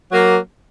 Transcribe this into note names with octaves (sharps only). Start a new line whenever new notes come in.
F#3 A#3